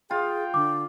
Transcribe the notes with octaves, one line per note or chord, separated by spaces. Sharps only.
F4 G#4 G5
D3 D6